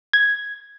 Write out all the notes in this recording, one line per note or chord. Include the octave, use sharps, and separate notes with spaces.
G#6